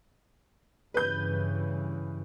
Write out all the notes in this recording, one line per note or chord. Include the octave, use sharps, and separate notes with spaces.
G2 C#3 E3 B4 G6